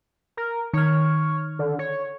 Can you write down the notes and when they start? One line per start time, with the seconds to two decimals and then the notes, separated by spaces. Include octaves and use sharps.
0.37 A#4
0.73 D#3 C#5 F6
1.59 D3
1.79 C#5